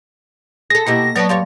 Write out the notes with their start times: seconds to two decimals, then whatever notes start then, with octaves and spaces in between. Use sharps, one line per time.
0.70 G#4 A4 A#6
0.87 B2 A#3 E4 G4 D#5
1.16 F#3 B3 C#5 D5 A5
1.29 G2 G4 C#5 F5 C6 A6